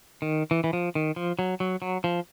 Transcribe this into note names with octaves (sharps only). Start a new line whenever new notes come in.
D#3
E3
E3
F3
D#3
F3
F#3
F#3
F#3
F3